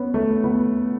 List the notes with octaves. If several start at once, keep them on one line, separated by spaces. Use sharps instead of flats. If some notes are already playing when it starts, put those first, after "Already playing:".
Already playing: B3 C#4
A3
B3